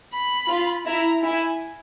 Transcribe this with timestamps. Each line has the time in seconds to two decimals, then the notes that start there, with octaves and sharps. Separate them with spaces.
0.12 B5
0.49 F4
0.86 E4 A#5
1.23 E4 G#5